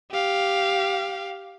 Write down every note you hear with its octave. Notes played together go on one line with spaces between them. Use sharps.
G4 F5